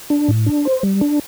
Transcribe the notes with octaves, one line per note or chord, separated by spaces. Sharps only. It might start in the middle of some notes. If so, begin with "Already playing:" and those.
D4
A2
D4
C5
G3
D4